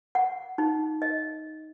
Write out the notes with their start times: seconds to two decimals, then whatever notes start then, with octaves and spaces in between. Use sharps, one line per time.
0.15 F#5
0.58 D#4
1.02 D#5